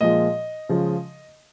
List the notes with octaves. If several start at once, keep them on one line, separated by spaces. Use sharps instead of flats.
A#2 F3 G#3 D#5
C#3 F3 G#3